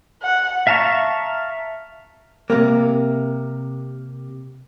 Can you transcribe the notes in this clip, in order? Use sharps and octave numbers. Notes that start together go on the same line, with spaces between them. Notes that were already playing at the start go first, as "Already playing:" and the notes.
F#5
E5 F5 A5 A#5 C#6
C3 A#3